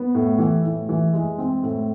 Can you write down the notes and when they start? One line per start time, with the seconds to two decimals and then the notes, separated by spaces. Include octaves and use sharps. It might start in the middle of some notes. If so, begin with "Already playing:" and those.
Already playing: B3
0.15 A2
0.38 E3
0.65 A2
0.89 E3
1.13 G#3
1.38 C4
1.63 A2